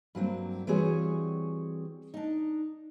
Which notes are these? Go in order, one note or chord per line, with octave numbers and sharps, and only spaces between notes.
G2 F#3 A#3 C4
E3 G3 C4 F#4 G#4 C#5
D4 D#4